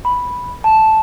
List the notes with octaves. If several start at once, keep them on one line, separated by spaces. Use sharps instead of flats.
B5
A5